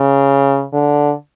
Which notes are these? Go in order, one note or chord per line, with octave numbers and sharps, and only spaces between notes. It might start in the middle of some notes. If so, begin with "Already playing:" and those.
Already playing: C#3
D3